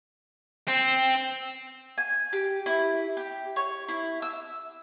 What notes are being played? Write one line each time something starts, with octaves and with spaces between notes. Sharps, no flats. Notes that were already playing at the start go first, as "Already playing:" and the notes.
C4
G#5
G4
E4
G4
C#5
E4
E6